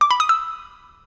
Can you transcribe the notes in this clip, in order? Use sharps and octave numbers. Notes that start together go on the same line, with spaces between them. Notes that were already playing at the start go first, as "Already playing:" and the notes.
D6
B5
D#6
E6